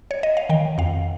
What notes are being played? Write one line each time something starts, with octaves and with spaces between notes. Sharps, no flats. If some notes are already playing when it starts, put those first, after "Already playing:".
C#5
D#5
F5
D#3 G5
F2 F5